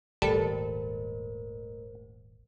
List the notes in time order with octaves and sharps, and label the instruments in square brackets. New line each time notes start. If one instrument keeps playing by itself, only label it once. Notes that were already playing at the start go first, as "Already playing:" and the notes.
[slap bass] D#1 G#1 [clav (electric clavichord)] G3 [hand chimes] A3 A#4 C5 [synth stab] A4